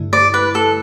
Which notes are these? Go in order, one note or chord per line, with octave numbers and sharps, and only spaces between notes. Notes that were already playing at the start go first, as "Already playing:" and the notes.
Already playing: G2 D3 A3 E4
D5
B4
A4